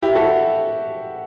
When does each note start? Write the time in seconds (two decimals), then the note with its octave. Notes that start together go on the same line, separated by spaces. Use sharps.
0.02 E4 G4
0.15 F#4 A4